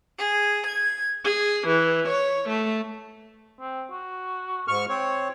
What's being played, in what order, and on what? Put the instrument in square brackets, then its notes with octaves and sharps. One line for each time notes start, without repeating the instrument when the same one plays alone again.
[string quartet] G#4
G#6
G#4
E3
C#5
A3
[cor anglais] C4
F#4
[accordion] G#2 C#6 F6
[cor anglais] C4 [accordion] C#5